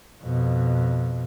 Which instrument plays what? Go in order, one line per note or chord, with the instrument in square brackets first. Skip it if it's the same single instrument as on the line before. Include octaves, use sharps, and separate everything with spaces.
[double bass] F2 B2